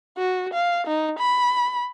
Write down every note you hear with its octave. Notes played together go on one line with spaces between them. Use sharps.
F#4
F5
D#4
B5